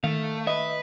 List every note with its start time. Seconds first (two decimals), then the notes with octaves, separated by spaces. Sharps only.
0.04 D#3 A3 F5
0.47 B4 D#5 E5